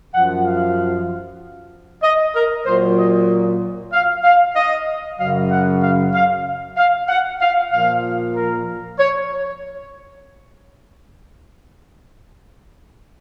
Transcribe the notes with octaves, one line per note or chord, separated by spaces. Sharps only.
F#2 F3 F#5
F5
D#5
A#4
A#2 F#3 C5
D#5
F5
F5
D#5
F#2 C#3 F#3 F5
F#5
F5
F5
F5
F#5
F5
A#2 F3 F5
A#4
C#5